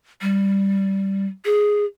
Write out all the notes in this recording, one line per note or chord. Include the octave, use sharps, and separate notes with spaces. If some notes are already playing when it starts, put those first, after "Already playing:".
G3
G#4